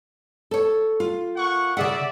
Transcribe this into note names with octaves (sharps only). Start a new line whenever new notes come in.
A4 C#5
F4
A#3 F#5 C#6
C#3 G#4 D5 E5 F#5